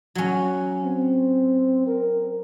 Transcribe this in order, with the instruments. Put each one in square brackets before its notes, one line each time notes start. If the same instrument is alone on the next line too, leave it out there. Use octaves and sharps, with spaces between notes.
[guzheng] F#3 C#4
[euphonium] C4
A#4